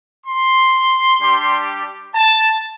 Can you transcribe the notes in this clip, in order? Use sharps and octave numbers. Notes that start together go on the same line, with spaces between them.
C6
G3 D4 G4
A5